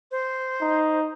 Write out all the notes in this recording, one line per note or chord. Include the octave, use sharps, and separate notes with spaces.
C5
D#4